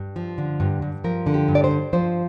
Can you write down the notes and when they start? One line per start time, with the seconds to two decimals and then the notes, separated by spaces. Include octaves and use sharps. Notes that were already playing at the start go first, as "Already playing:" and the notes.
Already playing: G2
0.16 F3
0.38 D3
0.60 G2
0.82 G2
1.04 F3 A#4
1.26 D3
1.34 G4
1.48 G2
1.55 D5
1.64 C5
1.71 G2
1.93 F3 C5